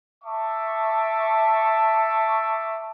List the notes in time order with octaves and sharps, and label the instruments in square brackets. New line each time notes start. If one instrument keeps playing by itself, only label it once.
[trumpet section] E5 A5 C#6 D6